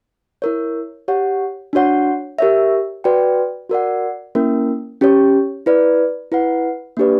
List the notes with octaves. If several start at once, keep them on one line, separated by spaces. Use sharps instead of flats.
E4 A#4 C#5
G4 C#5 F#5
D4 F#4 C#5 F#5
G4 A#4 C#5 E5
F#4 B4 D5 G5
F#4 A#4 D5 F#5
A#3 C#4 E4 A#4
C#4 G4 C#5
E4 B4 D5
E4 B4 F#5
A#3 D4 G4 B4 D5